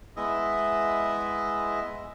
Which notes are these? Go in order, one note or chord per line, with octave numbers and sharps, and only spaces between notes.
G#3 B3 E4 D#5 E5